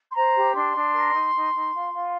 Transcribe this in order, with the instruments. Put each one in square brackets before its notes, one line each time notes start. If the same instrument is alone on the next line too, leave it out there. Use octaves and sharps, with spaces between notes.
[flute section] C6
C5 A#5
G4
D4 C6
D4
A#4
D#4
D#4
D#4
F4
F4